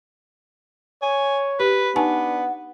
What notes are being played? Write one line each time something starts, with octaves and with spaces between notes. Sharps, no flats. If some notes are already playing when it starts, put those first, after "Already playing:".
C#5 G#5
G4 B4
B3 D4 D#4 F#5 G#5 A5